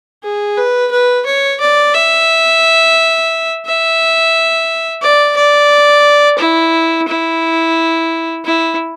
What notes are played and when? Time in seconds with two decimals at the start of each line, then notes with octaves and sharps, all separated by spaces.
0.23 G#4
0.57 B4
0.91 B4
1.26 C#5
1.60 D5
1.94 E5
3.66 E5
5.02 D5
5.36 D5
6.39 E4
7.08 E4
8.45 E4